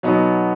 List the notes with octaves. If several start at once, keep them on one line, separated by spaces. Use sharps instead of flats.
B2 F#3 B3 D#4